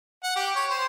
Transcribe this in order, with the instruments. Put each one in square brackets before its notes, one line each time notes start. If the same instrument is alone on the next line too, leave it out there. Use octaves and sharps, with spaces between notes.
[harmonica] F#5
G4
C#5
C5